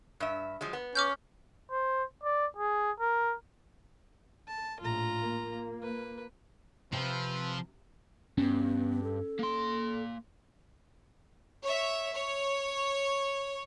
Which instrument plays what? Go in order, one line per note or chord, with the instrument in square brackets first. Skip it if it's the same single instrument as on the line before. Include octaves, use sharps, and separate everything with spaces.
[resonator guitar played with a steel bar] G2 E5
F3 F#3 G#3
B3
[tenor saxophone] C#4 [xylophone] D6 F6 G6
[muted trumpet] C5
D5
G#4
A#4
[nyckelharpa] A5
[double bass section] A#1 A2 [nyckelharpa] F4 A#5
[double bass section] A#3
[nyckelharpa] B4
[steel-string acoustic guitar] C3 [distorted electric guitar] F3 [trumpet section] C4 B4
[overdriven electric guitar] G2 [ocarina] B3 [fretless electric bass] C#4
[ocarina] A4
[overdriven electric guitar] A#3 C6
[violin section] C#5 E5
C#5